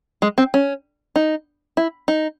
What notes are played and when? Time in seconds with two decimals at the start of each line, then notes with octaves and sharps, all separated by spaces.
0.22 G#3
0.38 C4
0.54 C#4
1.16 D#4
1.77 E4
2.08 D#4